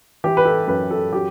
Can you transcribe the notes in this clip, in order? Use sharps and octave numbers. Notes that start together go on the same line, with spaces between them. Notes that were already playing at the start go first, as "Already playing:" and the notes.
E3 G4
B4
A4
F#2 B4
A4
F#3 G4